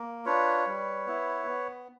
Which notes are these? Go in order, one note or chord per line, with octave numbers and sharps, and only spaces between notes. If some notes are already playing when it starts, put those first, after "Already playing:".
Already playing: A#3
D4 F4 B4 C#5
G3
B3 E4
B3